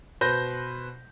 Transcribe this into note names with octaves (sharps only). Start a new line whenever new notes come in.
B2 B4 C5 G6 A#6